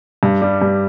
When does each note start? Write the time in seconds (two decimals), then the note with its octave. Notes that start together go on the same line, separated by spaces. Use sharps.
0.23 G2
0.42 G3
0.62 G2